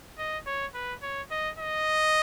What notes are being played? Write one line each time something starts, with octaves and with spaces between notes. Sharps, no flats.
D#5
C#5
B4
C#5
D#5
D#5